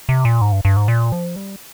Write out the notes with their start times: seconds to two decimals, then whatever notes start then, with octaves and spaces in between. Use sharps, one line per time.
0.09 C3
0.25 A#2
0.41 G#2
0.52 G2
0.65 G2
0.77 G#2
0.88 A#2
1.12 F3
1.36 G3